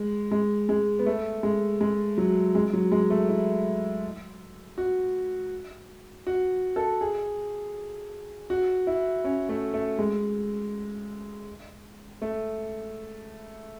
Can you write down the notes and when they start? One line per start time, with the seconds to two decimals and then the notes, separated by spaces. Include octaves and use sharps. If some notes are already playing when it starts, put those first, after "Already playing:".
Already playing: G#3
0.31 G#3
0.69 G#3
0.99 B3
1.06 A3
1.43 G#3
1.81 G#3
2.18 F#3
2.55 G#3
2.73 F#3
2.92 G#3
3.10 A3
3.29 E4
4.78 F#4
6.27 F#4
6.76 A4
7.01 G#4
8.50 F#4
8.87 E4
9.24 C#4
9.49 A3
9.74 A3
9.99 G#3
12.22 A3